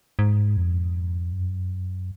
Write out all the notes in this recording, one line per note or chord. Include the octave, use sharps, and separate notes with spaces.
G#2
F2
F#2